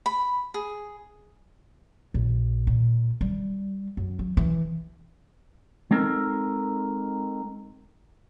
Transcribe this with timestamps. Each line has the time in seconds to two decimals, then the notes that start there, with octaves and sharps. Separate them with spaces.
0.06 B5
0.54 G#4
2.14 A#1
2.67 A#2
3.21 G3
3.97 F#2
4.19 F#3
4.37 E3
5.91 G#3 C4 D#4 A4 A#4